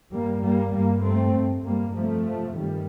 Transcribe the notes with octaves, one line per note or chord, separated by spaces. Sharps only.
G2 G3 A#3
G3 A#3
G2 G3 A#3
A3 C4
G2
G3 A#3
F2 C3 F3 A3
G2 D#3 G3